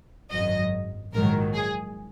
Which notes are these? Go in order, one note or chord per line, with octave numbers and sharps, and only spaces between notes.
G#1 F#2 F#3 D#5
A#1 G#2 D#3 F#3 A#4
G#4